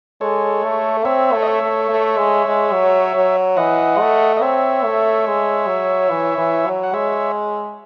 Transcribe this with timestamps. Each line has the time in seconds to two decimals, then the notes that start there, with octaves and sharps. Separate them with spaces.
0.21 G#3 A4 C#5
0.63 A3
1.05 C4 C#5 E5
1.33 A3
1.42 D#5
1.47 C#5 E5
1.61 A3
1.89 A3
2.17 G#3
2.46 G#3
2.73 F#3
3.16 F#3
3.57 E3 D#5 F#5
4.00 A3
4.37 D#5
4.42 C4 C#5 E5
4.84 A3
5.26 G#3
5.67 F#3
6.10 E3
6.38 E3
6.66 F#3
6.83 F#5
6.94 G#3 C#5 E5